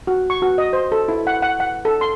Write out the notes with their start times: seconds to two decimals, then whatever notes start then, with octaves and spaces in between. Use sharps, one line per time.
0.07 F#4
0.30 C#6
0.42 F#4
0.58 D#5
0.73 C5
0.92 A4
1.08 E4
1.27 F#5
1.42 F#5
1.60 F#5
1.85 A4
2.01 C6